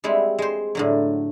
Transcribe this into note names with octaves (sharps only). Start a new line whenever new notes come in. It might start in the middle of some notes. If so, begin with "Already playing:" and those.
G3 G#3 C4 E4
G#3 C5
A2 D3 F#3